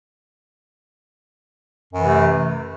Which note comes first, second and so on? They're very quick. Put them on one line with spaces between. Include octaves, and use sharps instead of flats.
F#2 E3 C3 A3